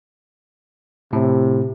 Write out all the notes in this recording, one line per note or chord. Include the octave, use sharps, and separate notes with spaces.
A2 C3